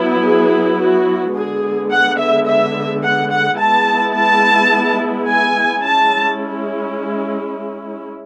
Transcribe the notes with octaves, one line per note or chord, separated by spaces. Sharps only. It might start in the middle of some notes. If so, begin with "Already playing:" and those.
Already playing: F#3 B3 E4
G#4
F#4
D3 G#3 B3 G#4
F#5
E5
E5
F#5
F#5
G#3 B3 E4 A5
A5
G#5
G#3 C#4 E4 A5